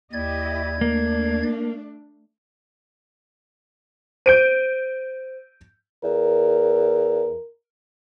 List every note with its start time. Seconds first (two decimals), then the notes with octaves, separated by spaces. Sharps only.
0.13 D#2 E4 G4 D5 D#5 G#6
0.81 A3 A#3 D4
4.26 C5 G6 D7 D#7
6.04 E2 A#4